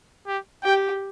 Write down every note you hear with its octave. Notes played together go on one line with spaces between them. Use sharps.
G4
G4 G5